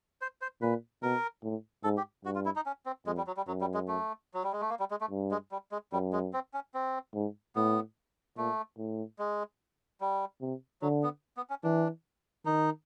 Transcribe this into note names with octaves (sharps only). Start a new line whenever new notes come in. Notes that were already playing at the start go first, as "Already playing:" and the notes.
C5
C5
A#2 B4
B2 A#4
A2
G#2 A4
G4
G2 F#4
F4
E4
D#4
C#4
C4
F2 G#3
G3
F#3
G3
F#2 F#3
G3
G#3
A3
F#3
G3
G#3
A3
A#3
G3
G#3
A3
G2
G#3
G3
G#3
F#2 G3
G#3
C4
C#4
C4
G#2
A2 B3
A#2 A3
A2
G#3
G3
C3
D3 F#3
B3
B3
C#4
E3 D4
D#3 D#4